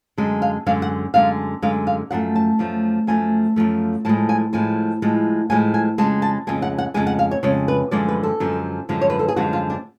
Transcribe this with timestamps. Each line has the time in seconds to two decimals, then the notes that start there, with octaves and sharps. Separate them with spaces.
0.18 F#2 D3 G#3
0.42 F5
0.66 F#2 D3 G#3 F5
0.82 F#5
1.14 F#2 D3 G#3 F5
1.62 F#2 D3 G#3 F5
1.87 F5
2.11 F#2 F3 A3 F#5
2.36 A5
2.59 F#2 F3 A3
3.07 F#2 F3 A3 G#5
3.56 F#2 F3 A3
4.05 A2 F3 G#3 A5
4.29 G#5
4.53 A2 F3 G#3 G#5
5.02 A2 F3 G#3
5.50 A2 F3 G#3 G#5
5.74 G#5
5.98 F2 C#3 G#3 A5
6.22 A5
6.47 F2 C#3 G#3 G#5
6.62 F#5
6.78 F#5
6.94 F2 C#3 G#3 G#5
7.07 F#5
7.19 F5
7.31 C#5
7.43 F2 C#3 G#3 C#5
7.68 B4
7.91 F#2 D3 F3 G#3 D5
8.08 B4
8.23 A4
8.40 F#2 D3 F3 G#3
8.89 F#2 D3 F3 G#3
9.01 C#5
9.10 B4
9.19 A4
9.28 G#4
9.36 F#2 D3 F3 G#3 F#4
9.53 F4
9.70 D4